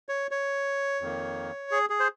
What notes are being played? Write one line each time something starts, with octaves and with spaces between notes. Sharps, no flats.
C#5
C#5
F2 D#3 A#3
G#4
G#4
C5